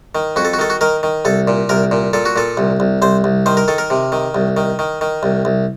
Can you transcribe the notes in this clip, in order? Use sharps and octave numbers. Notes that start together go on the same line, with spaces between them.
D#3
F2 F#4
A4
F#4
D#3 A4
F#4
D#3 A#4
D#3
C2 A4
A#2
C2 A#4
A#2
A#2 A4
F#4
A#2 A4
C2
C2
C2 C5
C2
D#3 C5
A#4
D#3 A4
A#4
C3
D#3
C2
D#3
D#3
D#3
C2
C2